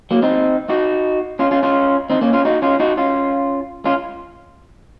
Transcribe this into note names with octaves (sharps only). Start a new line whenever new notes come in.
F#3 A#3
C4 D#4
D#4 F#4
C#4 F4
C#4 F4
C#4 F4
C4 D#4
A#3 C#4
C#4 F4
D#4 F#4
C#4 F4
D#4 F#4
C#4 F4
C#4 F4